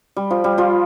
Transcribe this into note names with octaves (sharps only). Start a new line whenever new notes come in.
G3
F3
G3
F3 F4